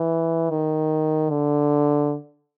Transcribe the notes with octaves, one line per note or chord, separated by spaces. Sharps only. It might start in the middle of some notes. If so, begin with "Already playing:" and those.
Already playing: E3
D#3
D3